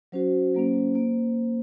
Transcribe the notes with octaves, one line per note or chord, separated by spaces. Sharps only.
F#3 C#4 F#4 C5
F#3 A#3 C#4
A#3